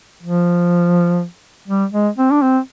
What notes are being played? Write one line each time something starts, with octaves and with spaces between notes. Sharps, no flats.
F3
G3
G#3
C4
D4
C4